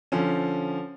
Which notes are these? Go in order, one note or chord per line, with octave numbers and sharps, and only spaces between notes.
D3 F3 C#4